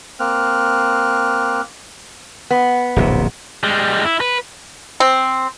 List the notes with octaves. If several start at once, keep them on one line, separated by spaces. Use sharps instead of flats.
A#3 C4 F6 F#6
B3
D1 A#1 C3
G3 G#3
E4
B4
C4